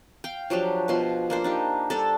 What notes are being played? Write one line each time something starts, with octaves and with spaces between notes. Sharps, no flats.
F5 G5
F3 F#3 D4 G4
B2 F3 C6
A#3 D4 C5
D4 D#4 G4
G3 D4 A4